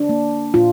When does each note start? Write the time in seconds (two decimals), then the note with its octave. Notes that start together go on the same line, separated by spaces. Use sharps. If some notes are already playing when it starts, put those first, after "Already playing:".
Already playing: D4
0.09 A#3
0.54 A#2 F4